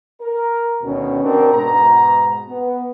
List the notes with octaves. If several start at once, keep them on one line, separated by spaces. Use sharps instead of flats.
A#4
D2 B2 D#3 C#4
C4 D4 D#4 F#4 A#4
G#2 B2 A#5
B3